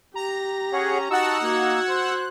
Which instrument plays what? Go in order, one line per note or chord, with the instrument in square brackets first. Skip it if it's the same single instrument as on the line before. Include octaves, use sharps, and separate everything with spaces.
[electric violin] G4 [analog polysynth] A#5
[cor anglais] C#4 [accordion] G#4 C#5 F#5
[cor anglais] D#4 [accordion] F#4 A5 C#6 [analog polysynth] F#5 E6
[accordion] A#3 [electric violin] F#4 G#6
[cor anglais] C5 [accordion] F#6